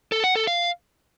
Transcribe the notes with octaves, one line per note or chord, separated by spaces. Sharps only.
A4
F#5
A4
F5